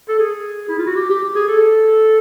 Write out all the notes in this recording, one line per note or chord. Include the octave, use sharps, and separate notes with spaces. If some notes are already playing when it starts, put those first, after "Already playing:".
A4
G#4
E4
F4
F#4
G4
G4
G4
G#4
A4